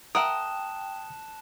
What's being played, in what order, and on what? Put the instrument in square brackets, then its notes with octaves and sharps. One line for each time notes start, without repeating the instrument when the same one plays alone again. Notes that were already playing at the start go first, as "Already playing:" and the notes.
[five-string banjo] A#4 E5 F#5 [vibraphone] G5 [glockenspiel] A5 F#6 E7 [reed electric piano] D#6